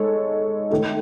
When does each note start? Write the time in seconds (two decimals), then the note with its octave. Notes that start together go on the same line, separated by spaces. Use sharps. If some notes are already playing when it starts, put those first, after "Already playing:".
Already playing: G#3 D#4 A4 C#5
0.70 D#3 A3 D#4